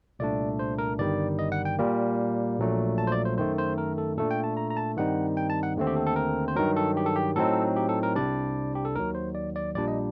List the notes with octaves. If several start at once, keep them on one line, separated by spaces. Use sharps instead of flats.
C2 A#2 A3 D4 D5
C5
A#4
G1 G2 D#3 G3 D5
D#5
F#5
G5
A#2 G3 A#3
A#1 A#2 F#3 A3
A5
C5
D5
C5
F#2 D#3 A3 C5
C5
A#4
A4
A#2 A3 D4 A4
G5
A5
A#5
A#5
A5
G2 D#3 G3 C4 D#4 F#5
G5
A5
F#5
D#2 D3 A3 C4
G4
A4
A4
A#4
C5
G2 D#3 F#3 A#4
A4
G4
A4
G4
A2 F#3 C4 D#4 A4
G4
A4
A#4
C2 C3 G3 D4 D5
G4
A4
D#2 D#3 F#3 A#4
C5
D5
D5
A#1 A#2 G3 D4 D5
D#5